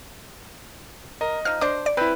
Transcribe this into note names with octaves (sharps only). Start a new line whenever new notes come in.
A#4 D#5
F3 D#4 F6
D4 C5 D5 D6
D5
C4 E4 B4